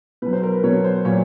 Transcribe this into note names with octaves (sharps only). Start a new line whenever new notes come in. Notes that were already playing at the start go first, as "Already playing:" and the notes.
B2 F#3 B4
C5
A#4
B4
B2 F#3 C#5
C5
A#2 F#3 C#5